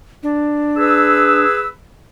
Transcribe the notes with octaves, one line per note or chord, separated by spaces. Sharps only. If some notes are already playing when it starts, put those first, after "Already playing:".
D4
G#4 B4 E6